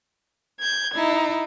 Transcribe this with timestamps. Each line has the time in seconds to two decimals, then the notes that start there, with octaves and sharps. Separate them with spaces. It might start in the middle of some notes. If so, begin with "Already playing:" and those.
0.60 G6 G#6
0.95 D#4 E4